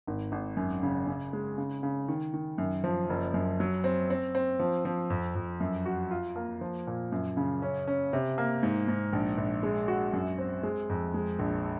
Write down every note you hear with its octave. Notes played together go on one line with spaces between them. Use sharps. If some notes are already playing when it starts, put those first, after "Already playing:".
G#1
G#1
F#2
C#3
C#3
G#3
C#3
C#3
D#3
D#3
F#2
F3
F#1
F#2
F#3
C4
C4
C4
F3
F3
F2
F2
F#2
F#4
F4
A#3
F3
A#2
F#2
C#3
C#4
C#4
C3
A#3
G#2
G#2
A#1
A#1
G#3
F#4
F#2
C4
G#3
F2
G#3
A#1